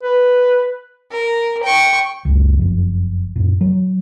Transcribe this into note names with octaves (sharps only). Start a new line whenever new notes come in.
B4
A#4
G5 C#6
F#1 C#2
F#1 F2
F#2 A#2
F#3